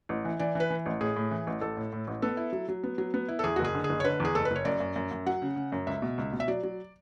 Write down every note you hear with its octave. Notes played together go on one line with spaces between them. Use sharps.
A1
E3
E3 D5
E3 B4
E3
A1
A2 G#4
A2
E3
A1
A1 A4
A2
A2
A1
B3 A4
E4
F#3
F#3
B3
F#3
B3
E4
A4
E2 G#4
F#4
F#1
G#4
D3
G#4
F#1
C#5
D3 B4
E2 G#4
F#1 A4
B4
F#1 C#5
F#2 D5
F#2
F#2
F#2
F#3 F#5
C#3
C#3
F#2
C#2 E5
B2
C#2
B2
E5
F#3 D5
F#3